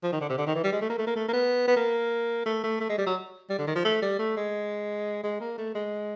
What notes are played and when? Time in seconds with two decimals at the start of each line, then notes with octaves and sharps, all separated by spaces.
0.03 F3
0.12 D#3
0.21 D3
0.29 C3
0.38 D3
0.47 D#3
0.55 E3
0.64 G3
0.72 G#3
0.81 A3
0.90 A#3
0.98 A3
1.07 A#3
1.16 A3
1.28 A#3
1.33 B3
1.68 B3
1.76 A#3
2.46 A3
2.63 A3
2.80 A3
2.89 G#3
2.98 G3
3.06 F#3
3.50 G3
3.59 D3
3.67 D#3
3.76 F3
3.85 A3
4.02 G3
4.19 A3
4.37 G#3
5.24 G#3
5.40 A#3
5.58 A3
5.75 G#3